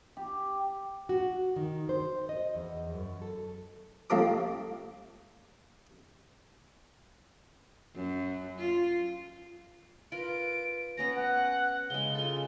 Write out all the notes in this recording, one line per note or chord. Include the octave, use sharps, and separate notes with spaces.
G4
F#4
D#3
C5
D#5
E2
F#2
A4
C2 F3 A#3 A4 A#4 D6
F#2
F4
F4 A#4 B4 D7
B3 C#4 A#5 A#6
F#5
C#3 G#3 G7
F4 A4